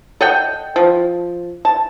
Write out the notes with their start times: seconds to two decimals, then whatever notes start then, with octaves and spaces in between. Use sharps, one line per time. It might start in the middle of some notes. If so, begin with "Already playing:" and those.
0.21 A4 D#5 F#5 G5
0.76 F3
1.65 A5